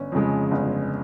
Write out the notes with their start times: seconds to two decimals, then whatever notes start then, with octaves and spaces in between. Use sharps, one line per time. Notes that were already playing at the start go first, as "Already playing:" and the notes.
Already playing: G1 C#4
0.12 F2 C#3 G#3
0.51 G1